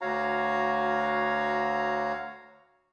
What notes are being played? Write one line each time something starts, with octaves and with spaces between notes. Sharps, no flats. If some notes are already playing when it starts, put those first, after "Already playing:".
D2 F#4 C#5 F5 A#5